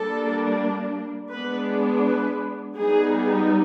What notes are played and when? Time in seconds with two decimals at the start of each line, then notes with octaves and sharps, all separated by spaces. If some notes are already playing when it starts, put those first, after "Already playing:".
Already playing: G3 A#3 D4 A4
1.31 G#3 B3 D4 B4
2.04 B4
2.76 G3 B3 D#4 G#4